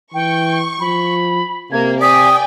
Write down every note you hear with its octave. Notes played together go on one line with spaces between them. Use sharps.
E3 G5 C#6
F3 B5
C3 A#3 G#6
D5 G5 G#5 D#6 B6